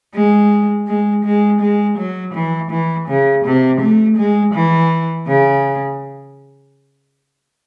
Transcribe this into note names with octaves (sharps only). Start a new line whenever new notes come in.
G#3
G#3
G#3
G#3
F#3
E3
E3
C#3
C3
A3
G#3
E3
C#3